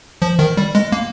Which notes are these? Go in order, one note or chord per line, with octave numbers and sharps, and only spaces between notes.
F3
D#3
G3
G#3
A#3